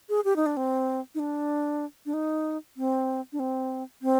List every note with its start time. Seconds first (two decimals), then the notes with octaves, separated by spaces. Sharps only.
0.09 G#4
0.25 G4
0.36 D#4
0.46 D4
0.57 C4
1.15 D#4
1.19 D4
2.06 D4
2.14 D#4
2.77 C4
3.33 D4
3.39 C4
4.02 C4